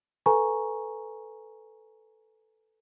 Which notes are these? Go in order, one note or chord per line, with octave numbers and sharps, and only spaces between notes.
A4 B4 G#5 A#5 C#6